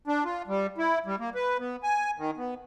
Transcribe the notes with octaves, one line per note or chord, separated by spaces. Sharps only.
D4
F4
G3
E4
G3
A#3
B4
B3
G#5
D#3
B3